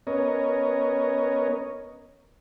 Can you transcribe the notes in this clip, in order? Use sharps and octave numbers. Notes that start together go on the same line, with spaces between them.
B3 C#4 A#4 C#5 D#5